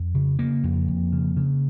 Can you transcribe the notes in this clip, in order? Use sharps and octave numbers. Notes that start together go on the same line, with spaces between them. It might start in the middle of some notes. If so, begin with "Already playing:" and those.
Already playing: F2
C#3
C#3 A#3
F2
F2
C#3
C#3